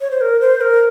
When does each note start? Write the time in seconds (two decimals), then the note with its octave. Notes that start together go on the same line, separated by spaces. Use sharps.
0.01 C#5
0.11 C5
0.21 A#4
0.41 C5
0.61 A#4